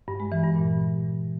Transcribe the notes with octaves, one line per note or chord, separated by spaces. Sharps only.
G2
G#3
E3
G2
A#2